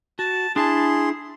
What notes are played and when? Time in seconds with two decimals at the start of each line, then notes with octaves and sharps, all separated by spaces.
0.19 F#4 A5
0.56 D4 E4 G#4 A5 C6